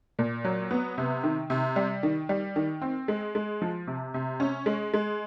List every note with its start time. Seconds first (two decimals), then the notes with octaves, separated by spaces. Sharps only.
0.19 A#2
0.44 F#3
0.71 B3
0.98 C3
1.24 D#3
1.50 C3
1.76 G3
2.03 D#3
2.29 G3
2.56 D#3
2.82 C4
3.08 G#3
3.35 G#3
3.62 F3
3.87 C3
4.14 C3
4.40 C#4
4.66 G#3
4.94 G#3